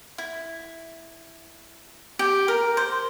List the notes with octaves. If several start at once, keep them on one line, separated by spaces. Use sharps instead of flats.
E4
G4
A#4
C5